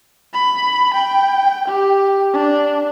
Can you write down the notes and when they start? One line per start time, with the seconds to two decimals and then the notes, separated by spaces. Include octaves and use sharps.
0.33 B5
0.94 G5
1.68 G4
2.34 D4